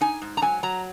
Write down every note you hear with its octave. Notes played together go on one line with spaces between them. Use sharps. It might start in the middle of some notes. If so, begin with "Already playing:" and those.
D#4 G#5
G#2
A#5
F#3 G#5
F#3 A#5